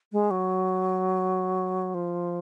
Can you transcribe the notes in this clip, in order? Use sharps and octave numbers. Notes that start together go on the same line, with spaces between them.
G#3
F#3
F3